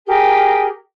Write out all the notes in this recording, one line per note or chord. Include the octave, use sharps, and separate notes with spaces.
G4 G#4 A#4